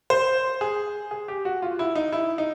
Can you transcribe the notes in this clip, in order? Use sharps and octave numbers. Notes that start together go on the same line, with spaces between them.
C5
G#4
G#4
G4
F#4
F4
E4
D#4
E4
D#4